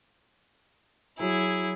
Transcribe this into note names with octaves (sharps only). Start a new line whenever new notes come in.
F#3 E4 G#4